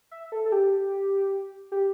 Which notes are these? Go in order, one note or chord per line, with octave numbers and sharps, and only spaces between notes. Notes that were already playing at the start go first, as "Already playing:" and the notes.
E5
A4
A4
G4
G4